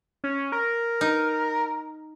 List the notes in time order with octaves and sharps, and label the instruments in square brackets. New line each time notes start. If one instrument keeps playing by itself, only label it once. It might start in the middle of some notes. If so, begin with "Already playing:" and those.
[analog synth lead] C#4
A#4
[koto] D#4